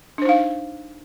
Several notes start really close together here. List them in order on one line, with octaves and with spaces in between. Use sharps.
D4 C5 D#4 F5